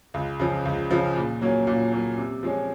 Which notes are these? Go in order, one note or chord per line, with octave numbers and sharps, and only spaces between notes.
C#2
C#3 F3
C#2
C#3 F3
A#2
F#3 A#3 C#4
A#2
F#3 A#3 C#4
C3
F3 G#3 C#4